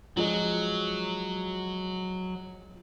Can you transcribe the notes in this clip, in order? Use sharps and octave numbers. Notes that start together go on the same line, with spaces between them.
F3 F#3 G#3